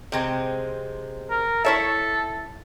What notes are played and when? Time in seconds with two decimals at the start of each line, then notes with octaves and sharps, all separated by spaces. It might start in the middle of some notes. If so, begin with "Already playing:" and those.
0.12 C3 G#3 C4
1.30 A#4
1.65 E4 A4 C#5 E5